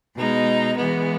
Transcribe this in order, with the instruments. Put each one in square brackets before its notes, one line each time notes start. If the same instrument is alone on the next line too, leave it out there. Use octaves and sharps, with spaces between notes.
[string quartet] B2 G#3 D#4
E3 G#3 B3